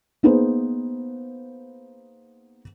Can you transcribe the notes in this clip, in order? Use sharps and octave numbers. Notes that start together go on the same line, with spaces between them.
A#3 B3 D#4 G#4 B4 C5